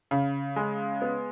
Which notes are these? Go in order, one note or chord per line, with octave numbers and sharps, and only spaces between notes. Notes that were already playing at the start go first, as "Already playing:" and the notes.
C#3
G#3
B3